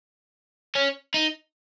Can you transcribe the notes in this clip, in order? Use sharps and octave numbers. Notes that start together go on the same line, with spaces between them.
C#4
D#4